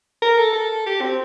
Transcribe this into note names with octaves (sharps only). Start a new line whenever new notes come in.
A#4
A4
A4
G4
C4